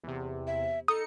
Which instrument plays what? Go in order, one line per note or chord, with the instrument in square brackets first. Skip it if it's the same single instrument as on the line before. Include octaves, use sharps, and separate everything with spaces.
[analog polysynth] E2 C3
[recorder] E5
[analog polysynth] D#4 C#7 [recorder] A4 [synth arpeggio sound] D#6